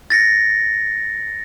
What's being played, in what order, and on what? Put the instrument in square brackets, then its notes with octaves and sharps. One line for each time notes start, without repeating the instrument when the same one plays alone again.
[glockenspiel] A6 A#6 C#7